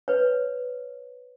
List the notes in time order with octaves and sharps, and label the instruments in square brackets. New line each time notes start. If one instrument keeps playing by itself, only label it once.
[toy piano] B4 C#5